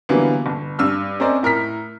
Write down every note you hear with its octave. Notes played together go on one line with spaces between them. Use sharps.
D3 E3 F#3 G3 A#3 B3
G1
G2 E6 F6
C4 C#4 A#4 C5 D5 D#5
A2 A#4 F6 B6